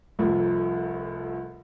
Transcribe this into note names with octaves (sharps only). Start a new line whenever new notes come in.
F1 C2 F2 F3